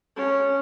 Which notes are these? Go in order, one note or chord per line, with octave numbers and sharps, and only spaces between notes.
C#4